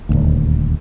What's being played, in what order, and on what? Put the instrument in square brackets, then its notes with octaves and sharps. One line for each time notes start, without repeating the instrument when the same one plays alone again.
[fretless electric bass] D#1 G#1 D2